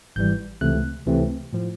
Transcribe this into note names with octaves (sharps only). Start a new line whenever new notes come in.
G#1 G#2 E3 G3 G6
C#2 C3 E3 A3 C4 F#6
C#2 C3 E3 A3 C4
A2 F3